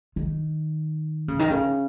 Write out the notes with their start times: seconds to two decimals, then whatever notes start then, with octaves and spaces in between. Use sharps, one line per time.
0.16 D#3
1.28 C#3
1.39 D#3
1.50 C#3